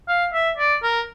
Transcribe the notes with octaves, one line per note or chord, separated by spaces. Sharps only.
F5
E5
D5
A#4